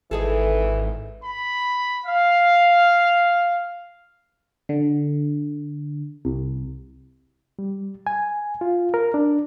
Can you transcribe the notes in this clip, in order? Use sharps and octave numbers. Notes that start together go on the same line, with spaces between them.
G#1 E3 D#4 G#4 A4
B5
F5
D3
C2
G3
G#5
F4
A#4
D4